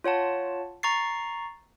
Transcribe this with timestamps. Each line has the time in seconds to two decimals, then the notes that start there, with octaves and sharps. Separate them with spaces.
0.04 F4 C#5 F#5 A5
0.83 A#5 C#6 A6 C7